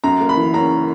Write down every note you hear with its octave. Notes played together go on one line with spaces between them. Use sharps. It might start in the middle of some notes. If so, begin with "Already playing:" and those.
F#2 A#5
A#3
B5
E3
C#4 A#5